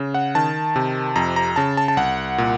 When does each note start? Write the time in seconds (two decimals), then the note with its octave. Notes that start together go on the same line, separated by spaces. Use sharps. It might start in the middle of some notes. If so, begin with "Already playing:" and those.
Already playing: C#3
0.14 F#5
0.35 D#3 A5
0.76 C3
1.16 F2 A#5
1.36 A#5
1.56 C#3 A5
1.77 A5
1.88 A5
1.97 C2 F#5
2.38 A#2